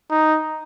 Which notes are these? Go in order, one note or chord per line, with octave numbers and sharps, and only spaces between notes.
D#4